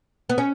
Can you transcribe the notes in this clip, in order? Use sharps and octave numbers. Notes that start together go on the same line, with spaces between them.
B3
C#4